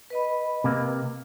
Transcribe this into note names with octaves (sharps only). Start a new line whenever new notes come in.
B4 D#5 B5
C3 A#3